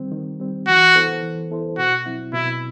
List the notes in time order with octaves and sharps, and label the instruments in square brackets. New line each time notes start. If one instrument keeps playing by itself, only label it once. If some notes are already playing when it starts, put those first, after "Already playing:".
Already playing: [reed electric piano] D#3 G3 C4
D#3
G3 C4
[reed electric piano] E3 [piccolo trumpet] F#4
[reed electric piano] B3 E4 A4 C5
E3
B3 E4 A4 C5
[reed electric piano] B2 [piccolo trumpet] F#4
[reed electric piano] F#3 C4 E4
[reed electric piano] B2 [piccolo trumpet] E4